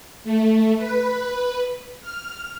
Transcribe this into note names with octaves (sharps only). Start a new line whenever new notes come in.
A3
B4
F6